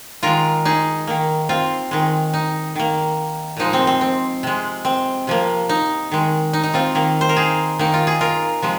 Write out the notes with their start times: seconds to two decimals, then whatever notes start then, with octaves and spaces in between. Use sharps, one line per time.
0.23 D#3 G#3 F4 A#4
0.65 D#4 G#4
1.07 D#3 A#3
1.49 C4 F4
1.91 D#3 G#3
2.33 D#4
2.76 D#3 A#3
3.57 A#2 F3 G#3 D#4
3.73 C4
3.87 C4
4.01 C4
4.43 C3 G#3
4.85 C4
5.27 C3 F3 A#3
5.69 D#4
6.11 D#3 G#3
6.53 D#4
6.63 D#4
6.74 C4 F4
6.95 D#3 A#3
7.21 C5
7.29 A#4
7.37 D#4 G#4
7.79 D#3 A#3 D#4
7.94 F4
8.07 G#4
8.21 F4 A#4
8.62 C3 F3 G#3